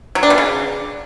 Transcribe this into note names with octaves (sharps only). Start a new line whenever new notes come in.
F#3
D4
B2
C#3